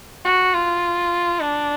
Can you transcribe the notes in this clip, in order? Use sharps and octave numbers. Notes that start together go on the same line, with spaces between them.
F#4
F4
D4